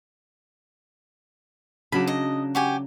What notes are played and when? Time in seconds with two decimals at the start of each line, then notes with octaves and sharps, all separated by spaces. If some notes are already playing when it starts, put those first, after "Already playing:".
1.92 C#3 F#3 D4 B5
2.07 D#5
2.55 F#4 G4 G#5